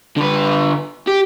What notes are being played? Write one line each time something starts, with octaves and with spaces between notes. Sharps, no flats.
D3 B4
G4